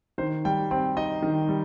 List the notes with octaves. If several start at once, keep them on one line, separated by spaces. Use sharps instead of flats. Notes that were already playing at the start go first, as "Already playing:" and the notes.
D#3 C5
G3 G5
C4 G5
D#4 D#5
D#3
G3